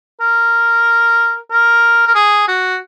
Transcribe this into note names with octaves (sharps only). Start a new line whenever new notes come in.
A#4
A#4
A#4
G#4
F#4